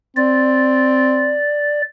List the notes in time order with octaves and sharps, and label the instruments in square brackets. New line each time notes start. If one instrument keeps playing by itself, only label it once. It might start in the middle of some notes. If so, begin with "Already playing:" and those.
[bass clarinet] C4 [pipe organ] D5